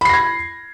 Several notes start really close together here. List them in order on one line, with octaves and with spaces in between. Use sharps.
B5 C7 A#6 G#6